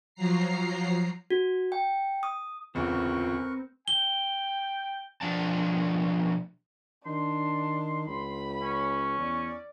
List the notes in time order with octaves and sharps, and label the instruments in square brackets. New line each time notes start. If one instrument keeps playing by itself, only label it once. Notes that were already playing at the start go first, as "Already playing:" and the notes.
[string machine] F3 F#3 A#5 C7
[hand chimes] F#4
G5
D#6
[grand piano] D1 E2 C#3 [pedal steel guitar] C4 [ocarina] F4 [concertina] A#4 B4 C#6
[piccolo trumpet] G5 [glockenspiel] G7
[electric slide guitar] B2 F3 D4 A5
[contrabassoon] D#3 [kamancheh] D4 [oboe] C6
[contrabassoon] C#2 [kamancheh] B5
[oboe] C#4
[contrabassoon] E2 [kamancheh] D5